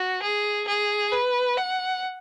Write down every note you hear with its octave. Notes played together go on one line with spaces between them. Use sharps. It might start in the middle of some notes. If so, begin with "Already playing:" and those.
Already playing: F#4
G#4
G#4
B4
F#5